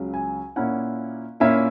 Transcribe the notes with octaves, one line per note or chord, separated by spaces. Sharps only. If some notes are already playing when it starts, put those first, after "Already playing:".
Already playing: C#2 C#3 F#3 C#4
G#5
A#2 A#3 C#4 E4 F#5
A#2 A#3 C#4 E4 E5